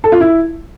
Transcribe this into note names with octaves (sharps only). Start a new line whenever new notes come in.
A4
F4
E4